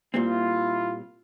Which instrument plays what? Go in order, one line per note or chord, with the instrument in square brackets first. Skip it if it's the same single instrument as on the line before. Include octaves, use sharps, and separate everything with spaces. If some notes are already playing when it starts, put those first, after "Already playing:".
[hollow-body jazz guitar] A#2 G3 C4 [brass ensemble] E4 F4